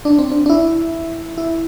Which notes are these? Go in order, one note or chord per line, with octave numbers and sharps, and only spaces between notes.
D4
C4
D4
D4
E4
E4